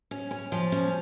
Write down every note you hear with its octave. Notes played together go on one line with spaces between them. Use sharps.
C#4
C#4
F3
C#4